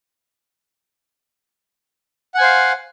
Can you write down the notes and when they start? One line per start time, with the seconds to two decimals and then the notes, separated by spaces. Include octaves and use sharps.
2.35 F#5
2.38 G#5
2.41 C5
2.44 F5